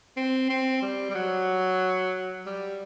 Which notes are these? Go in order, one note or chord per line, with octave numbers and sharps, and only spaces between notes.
C4
C4
G3
G3
F#3
G3